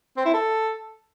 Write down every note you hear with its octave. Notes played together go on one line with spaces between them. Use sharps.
C4
E4
A4